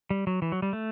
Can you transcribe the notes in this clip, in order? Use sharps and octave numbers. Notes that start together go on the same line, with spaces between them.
G3
F#3
E3
F#3
G3
A3